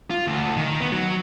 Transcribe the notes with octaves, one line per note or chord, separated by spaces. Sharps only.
F4
D2
D#3
B3
F#3